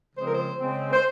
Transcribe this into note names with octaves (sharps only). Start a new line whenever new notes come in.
C#3 F3 G#3 C4 C5
A#4
C5
C#3 G#3 C4
C5